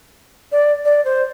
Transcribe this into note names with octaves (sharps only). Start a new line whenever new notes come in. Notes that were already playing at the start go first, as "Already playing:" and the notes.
D5
D5
C5